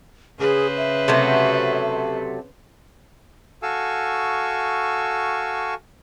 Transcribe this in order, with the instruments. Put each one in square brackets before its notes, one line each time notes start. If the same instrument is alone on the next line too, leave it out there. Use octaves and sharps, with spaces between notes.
[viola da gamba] C#3 B4 C5 [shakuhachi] G#4
[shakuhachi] E5
[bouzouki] C3 F#3 A3
[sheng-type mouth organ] F#4 A4 F5 G#5 C#6 E6